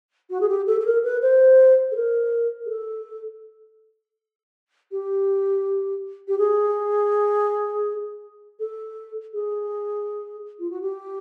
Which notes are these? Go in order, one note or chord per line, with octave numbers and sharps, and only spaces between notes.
F#4
G#4
G4
A4
A4
A#4
B4
C5
A4
A#4
G#4
A4
G4
G4
G#4
A4
G#4
F4
F#4
G4